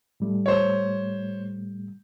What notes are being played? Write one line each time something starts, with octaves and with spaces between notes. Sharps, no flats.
A2 G3 A3
C5 C#5